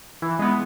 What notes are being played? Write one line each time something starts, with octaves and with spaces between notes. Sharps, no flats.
E3
G#3 B3